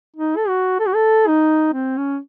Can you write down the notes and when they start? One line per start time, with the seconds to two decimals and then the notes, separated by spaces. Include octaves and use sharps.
0.17 D#4
0.37 A4
0.48 F#4
0.80 A4
0.87 F#4
0.95 A4
1.27 D#4
1.74 C4
1.97 C#4